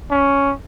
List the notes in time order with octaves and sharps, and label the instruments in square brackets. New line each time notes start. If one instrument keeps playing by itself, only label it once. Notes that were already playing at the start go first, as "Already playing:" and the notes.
[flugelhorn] C#4